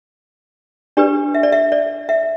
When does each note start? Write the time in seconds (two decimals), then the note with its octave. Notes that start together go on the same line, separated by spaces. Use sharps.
0.97 D4 G4 B4 D5
1.35 E5
1.43 D5
1.52 E5
1.72 D5
2.09 E5